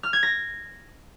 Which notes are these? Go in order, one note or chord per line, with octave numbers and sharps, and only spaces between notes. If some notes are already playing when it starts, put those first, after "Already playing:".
F6
G#6
A#6